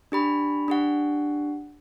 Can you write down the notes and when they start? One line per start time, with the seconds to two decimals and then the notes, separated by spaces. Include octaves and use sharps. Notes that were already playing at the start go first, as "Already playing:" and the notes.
0.12 D4 G4 B5
0.68 D4 G4 F#5